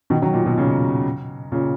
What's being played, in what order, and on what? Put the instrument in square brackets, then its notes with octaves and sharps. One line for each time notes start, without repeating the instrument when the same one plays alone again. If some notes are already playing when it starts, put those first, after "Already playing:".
[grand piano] B2 D#3
D#3 F#3
A#2
B2
A#2 C#3
A#2 C#3